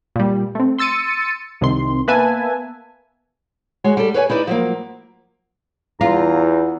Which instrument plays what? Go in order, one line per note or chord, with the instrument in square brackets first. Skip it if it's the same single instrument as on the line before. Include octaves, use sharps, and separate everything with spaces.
[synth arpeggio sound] A#2 G3
A3 C4
C6 E6 A6 C#7 D#7
C2 C3 D#3 C6
A#3 B3 B4 E5 G#5 A5
[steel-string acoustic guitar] G#3 F#4 C#5
G3 A4
B4 C#5 E5 G#5
D#4 E4 B4 D5
F3 F#3 A#3
[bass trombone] E2 [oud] F4 [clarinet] A#5